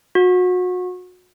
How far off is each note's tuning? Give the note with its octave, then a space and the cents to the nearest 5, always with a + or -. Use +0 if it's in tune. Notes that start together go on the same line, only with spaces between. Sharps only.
F#4 -30